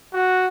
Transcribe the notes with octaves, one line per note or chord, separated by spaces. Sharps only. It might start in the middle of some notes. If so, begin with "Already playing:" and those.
F#4